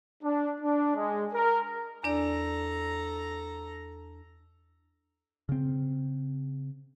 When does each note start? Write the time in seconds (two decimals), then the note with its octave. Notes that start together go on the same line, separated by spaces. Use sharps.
0.23 D4
0.61 D4
0.95 G#3
1.34 A#4
2.04 E2 D4 A4 D5 A#5
5.49 C#3 C4